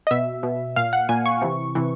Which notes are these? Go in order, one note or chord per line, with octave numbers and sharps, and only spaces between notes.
D#5
B2 E5
B2
A#2 F5
F#5
A#2 G#5
C#6
C3 E3
C3 E3